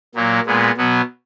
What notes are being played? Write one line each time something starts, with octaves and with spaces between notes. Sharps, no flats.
A#2 F#3 A#3
A#2 G#3 B3
B2 F#3 B3